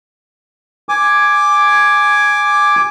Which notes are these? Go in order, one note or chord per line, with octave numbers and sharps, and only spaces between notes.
G#5 D6